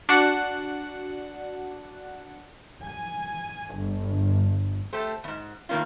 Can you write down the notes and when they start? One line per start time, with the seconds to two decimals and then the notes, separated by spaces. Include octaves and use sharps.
0.09 D4 F#4 F#5
2.84 G#5
3.75 G1
4.93 A3 G4 A4 C5
5.24 E2 G#2
5.69 A2 D#3 A#3 C#4 F4